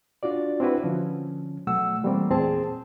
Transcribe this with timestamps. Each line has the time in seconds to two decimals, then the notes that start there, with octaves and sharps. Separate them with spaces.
0.23 D4 F4 F#4 D5
0.60 C4 D4 E4 F#4 B4
0.83 D3 F3 C#4
1.67 B2 F#3 A3 F#5 E6
2.03 E3 G3 A3 A#3 C4
2.30 E2 A#2 C4 G#4 A5